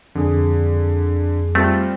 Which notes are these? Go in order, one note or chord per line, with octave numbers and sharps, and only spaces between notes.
F2 D3 G#4
G3 A3 C4 F4